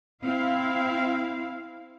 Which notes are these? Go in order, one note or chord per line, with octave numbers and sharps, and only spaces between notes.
C4 E4 F5